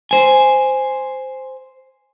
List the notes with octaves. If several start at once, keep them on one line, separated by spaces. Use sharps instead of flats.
C5 G#5